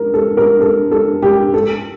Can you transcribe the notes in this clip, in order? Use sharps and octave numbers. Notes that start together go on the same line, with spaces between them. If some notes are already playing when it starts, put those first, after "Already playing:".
Already playing: A#4
A4
A#4
A4
A4
G4
A4